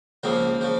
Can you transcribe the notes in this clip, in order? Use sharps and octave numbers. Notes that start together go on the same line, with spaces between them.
C#2 C#3 F3 A#3
C#3 F3